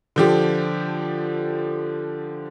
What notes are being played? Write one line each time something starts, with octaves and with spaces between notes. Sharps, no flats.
D3 F3 G4